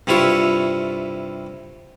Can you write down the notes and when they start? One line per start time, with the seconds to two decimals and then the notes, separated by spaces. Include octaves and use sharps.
0.07 G2 C3 E4 F4 C#6